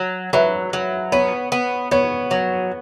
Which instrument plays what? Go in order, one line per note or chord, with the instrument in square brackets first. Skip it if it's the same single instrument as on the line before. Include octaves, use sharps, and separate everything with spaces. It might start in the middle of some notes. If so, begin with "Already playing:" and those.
Already playing: [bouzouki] F#3
[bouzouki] F#3 [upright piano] B4 E5
[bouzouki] F#3
[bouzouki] B3 [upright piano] C#5
[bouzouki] B3
[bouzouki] B3 [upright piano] C#5
[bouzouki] F#3